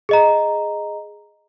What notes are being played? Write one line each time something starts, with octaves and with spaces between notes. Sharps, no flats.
G#4 D#5 A#5